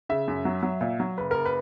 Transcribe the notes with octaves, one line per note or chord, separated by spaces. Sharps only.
C#3 E5
F#2
F#3
F#3
A#2
F#3
F#1 B4
F#1 A#4
B4